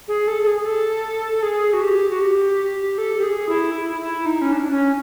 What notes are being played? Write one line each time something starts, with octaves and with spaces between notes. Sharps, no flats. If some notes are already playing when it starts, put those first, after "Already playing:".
G#4
A4
A4
G#4
A4
G#4
F#4
G4
F#4
G4
A4
G4
G#4
E4
E4
E4
D#4
C#4
D4
D4
C#4